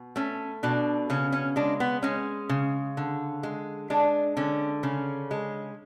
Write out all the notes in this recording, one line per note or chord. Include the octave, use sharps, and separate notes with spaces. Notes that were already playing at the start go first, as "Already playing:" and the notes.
Already playing: B2
A3 C#4
B2 D4
C#3 C#4
C#4
G#3 D4
B3
G#3 C#4
C#3
D3
G#3
G#3 D4
D3 C#4
C#3 C#4
G#3